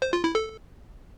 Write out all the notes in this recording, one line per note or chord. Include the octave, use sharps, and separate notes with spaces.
C5
F4
E4
A4